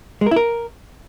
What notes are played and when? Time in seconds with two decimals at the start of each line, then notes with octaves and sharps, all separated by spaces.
0.21 G#3
0.26 A#4
0.31 E4
0.36 A#4